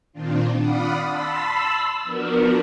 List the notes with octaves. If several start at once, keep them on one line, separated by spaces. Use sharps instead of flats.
A#2 D#3 C4 D4 F4
D5 F5 F#5 B5 D#6
A5 B5 C6 E6 B6
F3 B3 D4 F#4 A#4